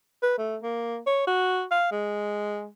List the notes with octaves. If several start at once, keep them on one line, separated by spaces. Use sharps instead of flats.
B4
A3
A#3
C#5
F#4
F5
G#3